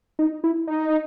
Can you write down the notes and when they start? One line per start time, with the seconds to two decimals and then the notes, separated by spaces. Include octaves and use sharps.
0.19 D#4
0.44 E4
0.67 D#4